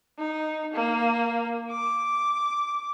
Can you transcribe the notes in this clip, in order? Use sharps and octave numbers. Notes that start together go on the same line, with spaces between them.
D#4
A#3
D6